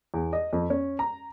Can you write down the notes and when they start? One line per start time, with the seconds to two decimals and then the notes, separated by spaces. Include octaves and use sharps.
0.14 E2
0.33 D#5
0.53 F2
0.70 C#4
0.99 A#5